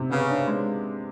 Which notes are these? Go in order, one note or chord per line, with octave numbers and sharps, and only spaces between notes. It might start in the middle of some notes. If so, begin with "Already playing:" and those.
Already playing: C3
C#3 B3
D4
G#3